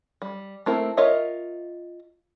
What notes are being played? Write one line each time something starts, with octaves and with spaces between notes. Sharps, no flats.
G3
A3 A#3 C4 E4 A#4
F4 A#4 C#5 D#5 E5